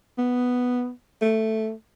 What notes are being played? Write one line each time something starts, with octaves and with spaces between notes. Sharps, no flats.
B3
A3